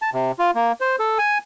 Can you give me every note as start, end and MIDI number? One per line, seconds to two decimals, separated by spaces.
0.02 0.10 81
0.14 0.32 48
0.39 0.51 65
0.55 0.72 58
0.81 0.96 72
0.99 1.18 69
1.18 1.38 80